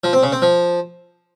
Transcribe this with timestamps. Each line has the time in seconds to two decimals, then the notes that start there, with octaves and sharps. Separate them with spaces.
0.04 F3
0.13 C4
0.23 C#3
0.32 C4
0.42 F3